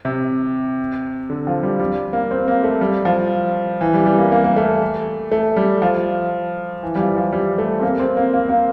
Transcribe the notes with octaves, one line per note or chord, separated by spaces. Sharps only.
C3
D3
F3
G3
G3
A#3
C4
A#3
A3
G3
F3
E3
G3
G3
A#3
A#3
A#3
A3
A3
G3
F3
E3
G3
F3
F3
G3
A3
C4
A#3
C4
A#3
A#3
A#3